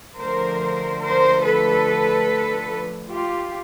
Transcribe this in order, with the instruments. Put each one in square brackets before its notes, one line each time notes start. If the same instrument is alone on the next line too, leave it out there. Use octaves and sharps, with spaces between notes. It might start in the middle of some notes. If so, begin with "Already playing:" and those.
[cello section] D3 F3 A3 A#4 C5
A#4 C5
A4 B4
F4 G4